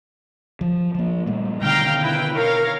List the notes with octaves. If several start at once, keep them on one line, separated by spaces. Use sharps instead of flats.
F3
F3 A#3
A#2 G3 A3
B2 D3 D#3 F5 G5 A#5
E4 B4 G5
A#4 C#5 F5